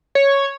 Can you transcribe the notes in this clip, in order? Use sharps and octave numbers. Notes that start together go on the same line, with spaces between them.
C#5